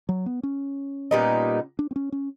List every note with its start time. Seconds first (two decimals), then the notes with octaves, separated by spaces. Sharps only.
0.09 F#3
0.26 B3
0.43 C#4
1.11 A#2 G3 B3 D#4
1.79 D4
1.91 C4
1.96 C#4
2.12 C#4